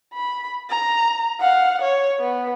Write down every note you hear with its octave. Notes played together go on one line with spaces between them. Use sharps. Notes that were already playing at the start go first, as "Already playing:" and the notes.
B5
A#5
F5 F#5
C#5
B3